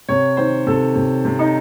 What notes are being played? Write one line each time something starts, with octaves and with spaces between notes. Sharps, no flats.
C3 C#5
D#3 C5
C3 A4
C3
C3
D#4